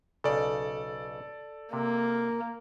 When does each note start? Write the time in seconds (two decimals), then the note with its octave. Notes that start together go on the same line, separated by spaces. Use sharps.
0.24 B1 C#3 A4 D5
1.73 C3 A#3